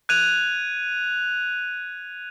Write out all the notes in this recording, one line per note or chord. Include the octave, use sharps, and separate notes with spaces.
F#6 G#6 D#7 F7